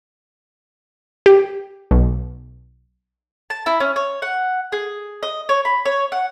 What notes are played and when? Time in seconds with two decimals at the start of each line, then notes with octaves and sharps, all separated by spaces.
1.26 G4
1.91 B1
3.50 A5
3.66 E4
3.80 C#4
3.96 C#5
4.22 F#5
4.72 G#4
5.23 D#5
5.49 C#5
5.65 B5
5.85 C#5
6.12 F#5